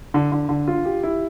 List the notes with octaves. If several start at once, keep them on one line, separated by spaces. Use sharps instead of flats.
D3
D3
D3
F4
G4
E4